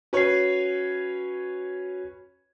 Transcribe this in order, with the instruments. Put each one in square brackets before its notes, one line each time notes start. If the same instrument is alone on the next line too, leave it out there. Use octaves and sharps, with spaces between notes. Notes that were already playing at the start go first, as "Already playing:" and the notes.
[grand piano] C#4 B4 C#5 [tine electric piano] F#4 C7